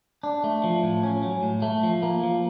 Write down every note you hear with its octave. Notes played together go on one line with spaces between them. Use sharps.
D4
A3
F3
A2
C#4
F#3
A2
A3
F3
A#3
F3